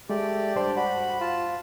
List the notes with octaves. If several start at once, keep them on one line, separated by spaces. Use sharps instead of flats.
G#3 A3 G4 D5
G2 D4 C5
F#4 B5
F4 A5